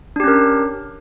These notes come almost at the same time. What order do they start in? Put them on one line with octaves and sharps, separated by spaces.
D4 G4 C#4 A#4